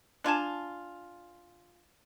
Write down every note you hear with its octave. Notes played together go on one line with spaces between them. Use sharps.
D4 F4 G#5 A5